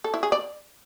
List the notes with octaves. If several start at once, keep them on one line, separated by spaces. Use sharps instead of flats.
A4
E4
G#4
D5